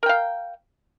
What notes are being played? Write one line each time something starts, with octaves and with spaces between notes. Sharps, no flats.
A#4 F5 G5